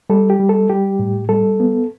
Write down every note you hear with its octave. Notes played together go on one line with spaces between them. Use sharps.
G3 A4
G4
G3
A4
G3 G4
A2
G3 A4
B3